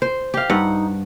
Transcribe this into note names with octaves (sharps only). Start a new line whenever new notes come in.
C5
G4 F5
G2 D#4 F#5